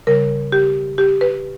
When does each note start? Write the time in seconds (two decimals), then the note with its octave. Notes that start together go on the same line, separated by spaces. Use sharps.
0.07 C#3 G3 A#4
0.52 G4
0.98 G4
1.21 B4